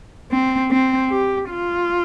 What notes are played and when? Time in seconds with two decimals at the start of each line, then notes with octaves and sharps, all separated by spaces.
0.32 C4
0.71 C4
1.10 G4
1.50 F4